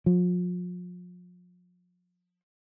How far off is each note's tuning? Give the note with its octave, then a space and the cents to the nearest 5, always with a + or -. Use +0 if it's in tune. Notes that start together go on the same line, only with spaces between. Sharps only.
F3 +40